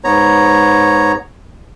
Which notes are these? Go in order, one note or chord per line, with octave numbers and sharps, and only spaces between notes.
G#2 B3 C#5 A#5